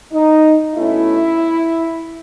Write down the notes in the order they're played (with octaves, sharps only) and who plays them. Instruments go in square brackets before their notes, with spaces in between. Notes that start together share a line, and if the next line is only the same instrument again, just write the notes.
[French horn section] D#4
B2 A3 C#4 E4